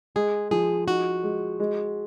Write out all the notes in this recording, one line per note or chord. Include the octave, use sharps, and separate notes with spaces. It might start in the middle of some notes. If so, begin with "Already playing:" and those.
G#3 G#4
F3 G#4
D#4 F#4
G#3
G#3